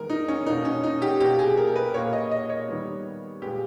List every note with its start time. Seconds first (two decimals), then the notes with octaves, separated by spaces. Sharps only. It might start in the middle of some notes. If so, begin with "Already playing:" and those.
Already playing: D#3 G#3 B3 A#4
0.10 D#4
0.28 C#4
0.46 B2 A#3 D#4
0.65 C#4
0.83 D#4
1.02 G4
1.20 B2 A#3 G4
1.39 G#4
1.57 A#4
1.67 A#4
1.76 B4
1.94 A#2 A#3 C#5
2.13 D#5
2.31 D#5
2.49 C#5
2.68 D#3 G3 B3
3.42 A#2 G#3 B3 G4